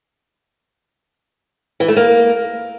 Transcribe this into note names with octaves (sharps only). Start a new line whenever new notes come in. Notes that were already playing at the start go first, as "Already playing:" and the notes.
E3
A3
A#3